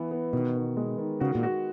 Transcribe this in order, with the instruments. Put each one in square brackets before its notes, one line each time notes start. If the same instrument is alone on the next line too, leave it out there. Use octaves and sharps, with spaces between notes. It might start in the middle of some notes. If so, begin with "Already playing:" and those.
Already playing: [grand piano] E3 B3
B3
[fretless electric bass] B2 [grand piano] D#3
[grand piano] D#3
G#3
D#3
[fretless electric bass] C#3 [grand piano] F#4
[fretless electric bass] A#2
[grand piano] F#4